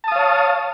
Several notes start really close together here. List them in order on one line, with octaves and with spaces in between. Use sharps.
A5 D#6 F5 C#5